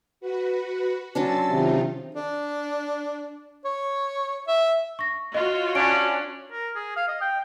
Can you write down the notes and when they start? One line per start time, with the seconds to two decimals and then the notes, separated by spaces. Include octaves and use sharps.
0.20 F#4 B4
1.15 F#3 C#4 D4 C6 E6 A6
1.50 C3 D#3 D#4 F4
2.15 D4
3.65 C#5
4.47 E5
4.99 C#6 A#6
5.34 F4 F#4 C#5 D#5
5.75 C#4 D4 A6 D7
6.52 A#4
6.76 G#4
6.96 F5
7.08 D#5
7.21 G5